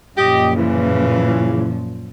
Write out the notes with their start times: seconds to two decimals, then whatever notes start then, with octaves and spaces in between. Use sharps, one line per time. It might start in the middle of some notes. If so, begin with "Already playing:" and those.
0.17 F#2 A#2 F3 G4 D#5
0.55 C#3 E3